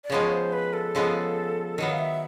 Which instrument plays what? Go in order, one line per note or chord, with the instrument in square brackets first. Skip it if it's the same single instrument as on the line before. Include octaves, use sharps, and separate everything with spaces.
[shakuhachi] D5
[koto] C#3 F3 G#3 B3 [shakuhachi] C#5
[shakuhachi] C5
B4
A4
[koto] C#3 F3 G#3 B3
[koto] D#3 F#3 B3 [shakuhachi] A#4
[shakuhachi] F5
E5